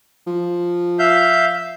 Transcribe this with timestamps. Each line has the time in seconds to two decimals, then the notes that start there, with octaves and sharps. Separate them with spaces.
0.27 F3
0.99 E5 F5 G6